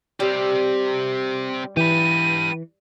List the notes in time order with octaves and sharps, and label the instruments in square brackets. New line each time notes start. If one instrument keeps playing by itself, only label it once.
[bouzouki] G3 [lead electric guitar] C4 G4
[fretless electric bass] E3 [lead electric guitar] G4 B4 [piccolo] D#7